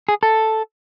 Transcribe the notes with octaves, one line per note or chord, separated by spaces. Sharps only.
G#4
A4